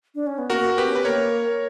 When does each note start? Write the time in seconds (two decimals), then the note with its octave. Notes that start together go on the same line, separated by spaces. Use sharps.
0.15 D4
0.27 C#4
0.38 B3
0.50 A#3 F#4 A#4
0.77 B3 G4 B4
0.87 C#4
0.95 B3 B4
1.05 A#3 A#4 C#5